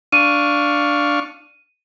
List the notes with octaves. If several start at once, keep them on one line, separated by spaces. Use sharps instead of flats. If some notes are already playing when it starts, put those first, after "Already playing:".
D4 F5 C#6 D#7